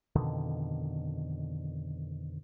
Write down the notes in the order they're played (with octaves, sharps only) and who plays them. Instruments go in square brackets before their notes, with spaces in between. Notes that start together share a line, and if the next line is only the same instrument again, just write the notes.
[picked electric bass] F2 B2 D3 D#3